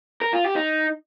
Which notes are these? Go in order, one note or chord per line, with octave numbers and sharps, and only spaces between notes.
A#4
F4
G4
D#4